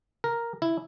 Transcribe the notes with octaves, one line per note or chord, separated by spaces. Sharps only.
A#4
E4